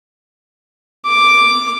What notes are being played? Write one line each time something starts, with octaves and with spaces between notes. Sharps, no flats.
D6